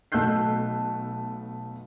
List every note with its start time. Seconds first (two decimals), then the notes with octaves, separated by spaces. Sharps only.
0.12 B1 A3 E6 F#6 G6 C7